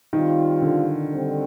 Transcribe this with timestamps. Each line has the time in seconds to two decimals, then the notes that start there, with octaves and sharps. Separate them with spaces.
0.13 D#3 G3 C4 F4
0.62 D3
1.10 D3 G3 C4